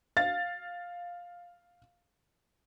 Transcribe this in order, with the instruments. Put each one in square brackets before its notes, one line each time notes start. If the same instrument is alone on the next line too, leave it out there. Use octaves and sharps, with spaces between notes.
[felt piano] F5 A6